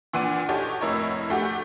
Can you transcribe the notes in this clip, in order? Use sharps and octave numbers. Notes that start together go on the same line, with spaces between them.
A#2 E3 D4 F#5 C6 D#7
D#4 F#4 G4 A4 C#5
F1 A2 E4 A#4 C#5 D#5
A3 F#4 G4